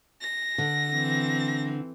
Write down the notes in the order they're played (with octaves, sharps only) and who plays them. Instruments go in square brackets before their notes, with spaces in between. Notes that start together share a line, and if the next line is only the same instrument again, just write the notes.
[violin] A#6
[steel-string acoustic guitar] D3
[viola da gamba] E3 C4